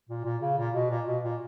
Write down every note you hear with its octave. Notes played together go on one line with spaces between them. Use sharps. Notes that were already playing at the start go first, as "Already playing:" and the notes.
A#2
A#2
C#3
A#2
B2
A#2
B2
A#2